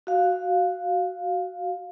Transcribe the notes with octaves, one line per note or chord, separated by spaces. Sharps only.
F#4 F5